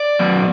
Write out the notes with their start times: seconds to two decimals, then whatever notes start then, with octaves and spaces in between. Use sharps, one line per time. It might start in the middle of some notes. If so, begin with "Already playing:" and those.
Already playing: D5
0.19 F#3 B3